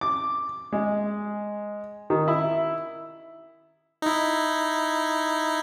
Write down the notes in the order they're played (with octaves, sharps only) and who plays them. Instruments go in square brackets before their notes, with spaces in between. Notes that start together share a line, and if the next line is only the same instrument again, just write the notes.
[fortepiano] D6
G#3
D#3
E4
[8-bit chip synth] D#4 E4